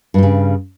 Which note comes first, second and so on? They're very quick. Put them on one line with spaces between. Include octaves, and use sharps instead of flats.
G2 G3 C#3